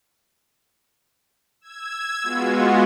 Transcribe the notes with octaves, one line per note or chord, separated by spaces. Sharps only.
E6 G#6
G#3 B3 F4 F#4